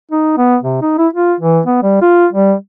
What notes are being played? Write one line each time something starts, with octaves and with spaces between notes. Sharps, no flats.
D#4
B3
C3
D#4
E4
F4
E3
B3
G3
F4
G3